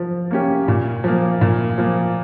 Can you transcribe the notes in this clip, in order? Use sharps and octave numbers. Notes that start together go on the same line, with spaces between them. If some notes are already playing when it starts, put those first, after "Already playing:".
Already playing: F3
A#3 C#4 G4
A#2
F3 A#3
A#2
F3 A#3